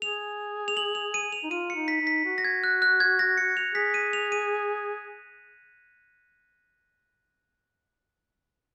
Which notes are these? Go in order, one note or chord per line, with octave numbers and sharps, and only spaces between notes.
G#4 F7
F7
F#7
F7
D#7
F7
D#4
F4 D#7
C#7
D#4
B6
D#4
B6
F#4
A#6
G#6
F#6
F#6
G#6
A#6
C#7
F7
G#4 B6
D#7
F7
D#7